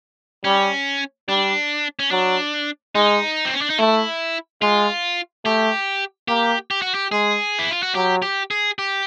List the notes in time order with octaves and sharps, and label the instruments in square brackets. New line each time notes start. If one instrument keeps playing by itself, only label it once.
[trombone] G3 [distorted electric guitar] C#4
[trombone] G3 [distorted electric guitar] D4
[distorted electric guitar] C#4
[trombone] F#3 [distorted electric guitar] D4
[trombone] G#3 [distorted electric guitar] D#4
[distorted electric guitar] C4
C#4
D4
D#4
[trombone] A3 [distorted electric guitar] E4
[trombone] G#3 [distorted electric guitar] F4
[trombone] A3 [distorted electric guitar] G4
[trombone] A#3 [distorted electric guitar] G4
[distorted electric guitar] G4
F#4
G4
[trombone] G#3 [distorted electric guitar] G#4
[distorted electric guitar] E4
F4
F#4
[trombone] F#3 [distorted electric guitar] G4
[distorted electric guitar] G4
G#4
G4